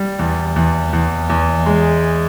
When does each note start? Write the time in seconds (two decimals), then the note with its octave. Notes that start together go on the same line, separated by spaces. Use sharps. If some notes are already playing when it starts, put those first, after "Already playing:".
Already playing: G3
0.19 E2
0.56 E2
0.93 E2
1.30 E2
1.66 G#3